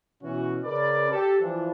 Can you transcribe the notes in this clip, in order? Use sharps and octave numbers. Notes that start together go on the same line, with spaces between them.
B2 E3 C#4 F#4
C#3 A#4 B4 D5
G4 A4
E3 F3 D4